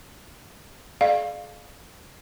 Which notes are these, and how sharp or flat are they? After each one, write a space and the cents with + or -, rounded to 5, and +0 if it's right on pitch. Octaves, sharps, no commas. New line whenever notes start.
G#4 +45 D5 +35 F5 +0